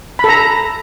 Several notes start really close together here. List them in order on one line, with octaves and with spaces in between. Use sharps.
B5 A4 A#5